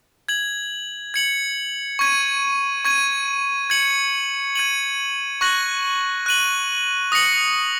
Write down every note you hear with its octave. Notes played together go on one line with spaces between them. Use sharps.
G#6 F#7
G#6 C#7 F#7
C#6 G#6 D#7
C#6 G#6 D#7
G#6 C#7 F#7
G#6 D#7 F#7
C#6 F#6 A#6 F#7
F#6 D#7 F#7
D#6 A#6 C#7 F#7